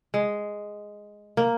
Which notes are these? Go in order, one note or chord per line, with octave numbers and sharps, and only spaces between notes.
G#3
A#3